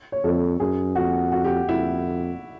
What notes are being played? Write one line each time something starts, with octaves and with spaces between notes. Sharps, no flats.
C#5
F2 A4
F#2 G#4
F2 F#4
F#4
G4
F2 E4